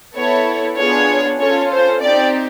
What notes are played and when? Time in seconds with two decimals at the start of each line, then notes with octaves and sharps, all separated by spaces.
0.15 B3 E4 A4 C#5
0.77 B3 D4 F4 G#4 C#5
1.39 C#4 F4 A4 C#5
1.71 C5
2.01 C4 D#4 G4 D5